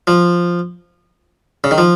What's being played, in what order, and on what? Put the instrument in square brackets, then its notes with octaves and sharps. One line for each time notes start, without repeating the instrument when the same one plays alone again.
[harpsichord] F3
C#3
D#3
F3